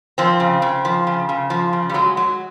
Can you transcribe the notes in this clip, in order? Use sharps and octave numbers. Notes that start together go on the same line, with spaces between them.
F3 C4
C#3
C#3
F3
C#3
C#3
F3
C#3
G3
F#3 G#3
F#3